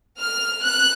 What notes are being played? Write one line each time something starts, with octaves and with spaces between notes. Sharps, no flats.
F6
F#6